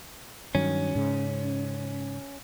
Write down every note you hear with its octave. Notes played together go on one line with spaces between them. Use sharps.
G2 D#3 F#3 C#4
G#2 C#3